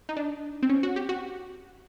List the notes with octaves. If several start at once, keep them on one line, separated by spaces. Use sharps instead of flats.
D#4
D4
C4
C#4
F#4
G4
F#4